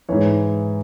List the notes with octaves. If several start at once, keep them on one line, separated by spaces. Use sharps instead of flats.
G#2 E3 C#5